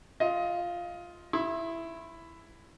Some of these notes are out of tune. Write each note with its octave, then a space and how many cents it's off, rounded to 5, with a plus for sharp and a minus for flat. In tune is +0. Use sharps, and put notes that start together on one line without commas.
F4 +0 D#5 +20
E4 +10 C6 +40